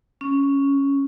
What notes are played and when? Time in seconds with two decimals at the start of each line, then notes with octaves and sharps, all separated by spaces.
0.21 C#4